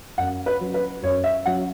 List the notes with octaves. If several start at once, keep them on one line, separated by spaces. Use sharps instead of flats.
F#2 F#5
B4
F#3 C#4
B4
F#2 C#5
E5
F#3 C#4 F#5